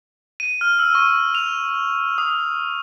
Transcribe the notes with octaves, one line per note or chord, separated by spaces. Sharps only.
D#7
F6
E6
C#6
F7
D#6